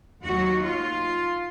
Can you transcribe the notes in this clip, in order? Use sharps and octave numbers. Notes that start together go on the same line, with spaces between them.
D#2 D#3 F#3 F#4
F4